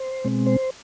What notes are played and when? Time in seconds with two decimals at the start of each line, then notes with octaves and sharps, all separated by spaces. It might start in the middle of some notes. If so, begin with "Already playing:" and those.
Already playing: C5
0.24 B2 G#3 C4
0.47 C5